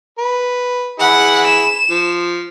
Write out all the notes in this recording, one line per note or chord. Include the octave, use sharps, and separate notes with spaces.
B4
E4 G#4 F#5 B5
E7
F3